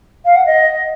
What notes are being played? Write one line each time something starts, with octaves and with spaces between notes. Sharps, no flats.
F5
F#5
D#5